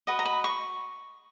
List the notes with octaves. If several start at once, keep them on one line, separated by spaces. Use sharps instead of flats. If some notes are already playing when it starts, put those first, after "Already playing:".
F#4 B4 D#5
A#5
B5
C#6